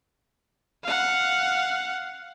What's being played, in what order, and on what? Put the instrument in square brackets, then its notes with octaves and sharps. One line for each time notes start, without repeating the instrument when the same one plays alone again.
[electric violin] F5 F#5